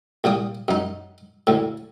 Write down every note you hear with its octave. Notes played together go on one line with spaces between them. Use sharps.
C2 A#2 G5 D#6
F#2 D#4
D2 A2